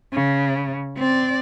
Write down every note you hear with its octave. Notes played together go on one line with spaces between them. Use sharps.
C#3
C4 D5